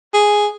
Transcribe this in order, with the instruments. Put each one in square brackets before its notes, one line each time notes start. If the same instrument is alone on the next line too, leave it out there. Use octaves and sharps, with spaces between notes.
[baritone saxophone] G#4